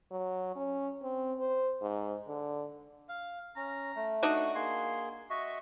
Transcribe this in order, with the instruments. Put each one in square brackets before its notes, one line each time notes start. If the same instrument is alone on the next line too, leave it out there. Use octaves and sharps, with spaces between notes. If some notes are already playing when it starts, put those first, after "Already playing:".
[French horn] F#3
C#4
C4
C5
G#2
D3
[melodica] F5
[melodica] C#4 [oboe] A#5
[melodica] A3
[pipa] D4 D#4 F#4 [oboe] C#6
[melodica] A#3 G#4 [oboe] C6
[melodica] F#4 D#5 E5 [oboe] C#6